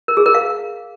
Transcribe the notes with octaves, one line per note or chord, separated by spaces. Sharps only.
A#4
G#4
A#4
F5